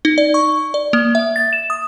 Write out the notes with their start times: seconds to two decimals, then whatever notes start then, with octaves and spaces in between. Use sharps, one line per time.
0.05 D#4
0.18 D5
0.34 C#6
0.74 D5
0.93 A#3
1.15 E5
1.36 A6
1.53 E7
1.70 D#6